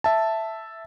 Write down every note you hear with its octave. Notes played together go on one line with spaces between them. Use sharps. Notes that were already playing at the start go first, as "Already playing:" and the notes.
E5 A5